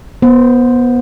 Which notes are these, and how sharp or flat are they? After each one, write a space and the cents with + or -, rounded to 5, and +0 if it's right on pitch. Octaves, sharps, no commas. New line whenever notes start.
B3 -20 C5 +0